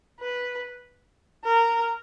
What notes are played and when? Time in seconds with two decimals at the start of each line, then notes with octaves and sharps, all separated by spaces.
0.20 B4
1.44 A#4